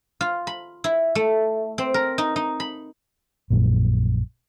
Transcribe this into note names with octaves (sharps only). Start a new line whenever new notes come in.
F4
B5
E4
A3
C4
A#4
D#4
D#4
B5
A#1 F#2 A#2